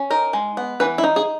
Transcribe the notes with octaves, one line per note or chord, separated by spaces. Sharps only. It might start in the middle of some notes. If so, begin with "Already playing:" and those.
Already playing: C#4
D#4 A#4
G#3
B3
E3 B4
E4
D#4
G#4